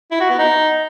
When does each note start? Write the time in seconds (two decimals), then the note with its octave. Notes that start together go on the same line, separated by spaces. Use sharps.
0.11 E4
0.20 F#4
0.29 B3
0.38 D#4